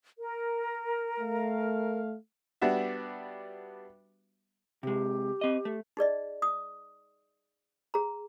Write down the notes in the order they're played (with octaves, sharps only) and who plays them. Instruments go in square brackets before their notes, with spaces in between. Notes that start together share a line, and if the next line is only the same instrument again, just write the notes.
[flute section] A#4
[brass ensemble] A3 F5
[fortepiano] G3 B3 D4 F#4 E5
[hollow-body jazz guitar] C3 G#3 [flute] G4
[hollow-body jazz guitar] C4 D#5
A3
[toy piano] D#4 G#4 D5 D#5
D#6
G#4 A#5